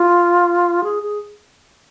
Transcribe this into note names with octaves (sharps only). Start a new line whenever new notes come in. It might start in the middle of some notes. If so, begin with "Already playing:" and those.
Already playing: F4
G#4
G#4